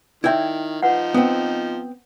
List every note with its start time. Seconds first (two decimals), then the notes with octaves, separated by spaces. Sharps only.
0.24 D#3 E4 D5 E5 G5
0.83 F3 D#4 B4 F#5
1.14 B3 C4